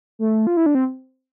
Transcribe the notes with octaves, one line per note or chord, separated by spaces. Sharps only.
A3
F4
E4
D4
C4